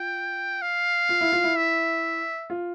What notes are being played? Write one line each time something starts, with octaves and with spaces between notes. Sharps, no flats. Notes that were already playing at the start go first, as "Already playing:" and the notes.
Already playing: F4 G5
F5
F4
E4
F4
E4
E5
F4